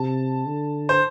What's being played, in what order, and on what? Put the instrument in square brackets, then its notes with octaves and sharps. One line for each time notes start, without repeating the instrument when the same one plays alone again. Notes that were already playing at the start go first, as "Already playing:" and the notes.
Already playing: [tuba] C3 [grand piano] A5
[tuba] D3
[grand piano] C5